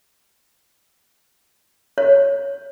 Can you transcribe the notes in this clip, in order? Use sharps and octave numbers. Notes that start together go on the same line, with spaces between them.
C#5